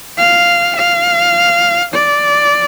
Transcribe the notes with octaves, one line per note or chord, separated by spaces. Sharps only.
F5
F5
D5